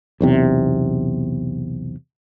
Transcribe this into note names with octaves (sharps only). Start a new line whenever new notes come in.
B1 E2 C3